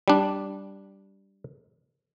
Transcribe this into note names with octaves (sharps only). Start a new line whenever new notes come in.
G3 D4